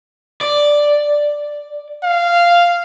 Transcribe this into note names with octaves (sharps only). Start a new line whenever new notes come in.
D5
F5